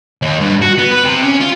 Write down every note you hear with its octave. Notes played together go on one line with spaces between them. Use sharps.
D#2
G2
F#4
B3
B4
C3
C#4
F4